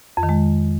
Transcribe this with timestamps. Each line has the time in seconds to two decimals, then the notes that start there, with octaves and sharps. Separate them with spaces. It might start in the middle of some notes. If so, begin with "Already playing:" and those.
0.17 F2
0.23 D#3
0.29 G#3